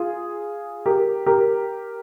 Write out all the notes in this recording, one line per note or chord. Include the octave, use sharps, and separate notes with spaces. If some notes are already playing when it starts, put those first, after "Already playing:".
Already playing: F4 G#4
G4 A#4
G4 A#4